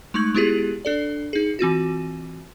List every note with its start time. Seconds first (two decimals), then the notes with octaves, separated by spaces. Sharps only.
0.14 G#3 A3 D#4 C#6 G#6 F#7
0.35 G#3 B3 E4 F4 G4 G#4
0.85 D4 A4 D5
1.33 D#4 G#4
1.59 E3 C4 F4 F#4